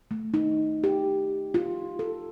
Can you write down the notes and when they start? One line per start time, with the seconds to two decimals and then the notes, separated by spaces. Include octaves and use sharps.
0.11 A3
0.34 D#4
0.84 G4
1.54 F4
1.99 A4